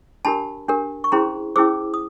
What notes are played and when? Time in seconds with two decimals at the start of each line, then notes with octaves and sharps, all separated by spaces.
0.25 D4 G4 A#4 A5 B5
0.69 D4 G4 A#4
1.04 C#6
1.12 C#4 E4 G#4 C5 A#5 C6
1.56 C#4 E4 G#4 C5 D6 E6
1.94 D#6